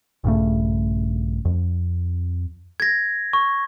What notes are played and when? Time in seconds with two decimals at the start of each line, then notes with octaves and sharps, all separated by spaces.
0.24 A#1 G2 C#3 A3
1.45 F2
2.80 G#6 A#6
3.33 C#6